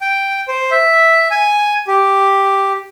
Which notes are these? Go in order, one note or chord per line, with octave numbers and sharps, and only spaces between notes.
G5
C5
E5
G#5
G4